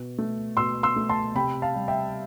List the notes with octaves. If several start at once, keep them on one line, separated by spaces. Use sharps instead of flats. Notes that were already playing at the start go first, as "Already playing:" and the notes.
Already playing: B2
A3
B2 C6 E6
C6 E6
A3
A5 C6
C3 G5 B5
F5 A5
G3
E5 G5